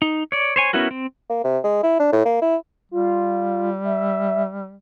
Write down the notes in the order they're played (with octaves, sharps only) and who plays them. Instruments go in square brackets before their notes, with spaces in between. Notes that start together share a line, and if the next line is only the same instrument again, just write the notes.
[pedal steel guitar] D#4
C#5 D5
C5 C#5 G#5
B3 C#4 E4 F#4 A#4
C4
[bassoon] A#3
C3
G#3
E4
D4
A2
A#3
E4
[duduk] G3 [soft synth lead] F4
[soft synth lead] E5